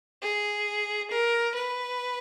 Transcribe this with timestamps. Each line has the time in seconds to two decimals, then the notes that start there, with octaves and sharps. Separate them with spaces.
0.22 G#4
1.10 A#4
1.55 B4